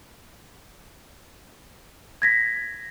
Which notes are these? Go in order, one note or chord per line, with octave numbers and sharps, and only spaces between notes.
G#6 A#6 B6